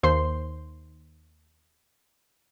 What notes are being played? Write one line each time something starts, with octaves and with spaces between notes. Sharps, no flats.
D#2 C5 C6